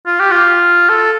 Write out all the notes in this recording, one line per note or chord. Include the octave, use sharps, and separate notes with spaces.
F4
G4
F4
A4